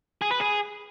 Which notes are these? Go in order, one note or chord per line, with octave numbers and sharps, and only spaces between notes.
G#4
B4
G#4